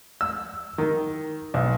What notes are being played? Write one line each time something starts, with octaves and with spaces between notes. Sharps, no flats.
E6
D#3
B1